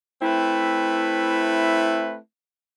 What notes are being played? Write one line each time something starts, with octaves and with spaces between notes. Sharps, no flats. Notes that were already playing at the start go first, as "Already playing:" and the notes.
A3 C4 E4 B4